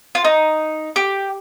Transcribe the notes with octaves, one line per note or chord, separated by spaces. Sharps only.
F4
D#4
G4